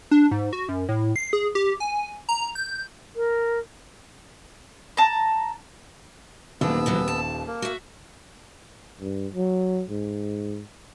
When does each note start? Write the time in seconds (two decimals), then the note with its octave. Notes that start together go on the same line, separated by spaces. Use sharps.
0.11 D4
0.31 G#2
0.53 F#4
0.69 F#2
0.89 A2
1.16 C7
1.33 G#4
1.55 G4
1.80 G#5
2.29 A#5
2.55 G6
3.16 A#4
4.97 A5 A#5
6.61 D#1 D#2 C3 F#3 B3 D4 E6
6.86 C3 E3 F#3
7.08 A5
7.47 A#3
7.62 F#4 E5
9.01 G2
9.34 F#3
9.90 G#2